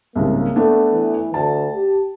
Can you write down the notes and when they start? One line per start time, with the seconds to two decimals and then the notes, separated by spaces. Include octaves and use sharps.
0.15 C2 G#2 C#3 A#3
0.56 A3 B3 D4
0.93 E3
1.34 D2 A5
1.75 G4